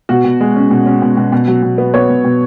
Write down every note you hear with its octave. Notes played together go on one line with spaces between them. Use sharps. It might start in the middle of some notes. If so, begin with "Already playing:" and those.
B2 F#4
B2
G#3
C#4
B2
C#4
B2
B2
B2
F#3
B2
B3
B3 C#5
B2
B2